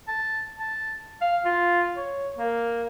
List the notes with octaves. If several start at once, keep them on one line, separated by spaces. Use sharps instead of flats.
A5
A5
F5
F4
C#5
A#3